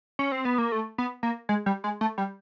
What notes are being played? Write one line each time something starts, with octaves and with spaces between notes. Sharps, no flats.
C#4
C4
B3
A#3
A3
B3
A#3
G#3
G3
G#3
A3
G3